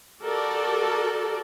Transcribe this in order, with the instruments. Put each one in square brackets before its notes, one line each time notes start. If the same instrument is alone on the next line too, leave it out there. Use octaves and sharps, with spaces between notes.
[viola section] F#4 G4 A4 A#4 D5